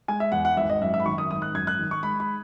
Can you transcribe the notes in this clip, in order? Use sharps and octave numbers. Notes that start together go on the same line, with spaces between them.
G#3 G#5
E5
E2 F#5
F#5
G#1 E5
D#5
F#2 E5
E5
B5
D#3 C#6
D#6
G#1 D#6
F#6
F#2 G#6
F#6
D#3
C#6
G#3 B5
B5